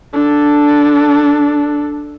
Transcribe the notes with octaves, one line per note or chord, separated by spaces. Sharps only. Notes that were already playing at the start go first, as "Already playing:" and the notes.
D4 A4